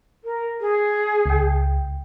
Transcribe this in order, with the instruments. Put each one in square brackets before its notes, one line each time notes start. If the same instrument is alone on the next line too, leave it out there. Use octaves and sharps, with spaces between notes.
[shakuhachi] A#4
G#4
[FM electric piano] C#2 G5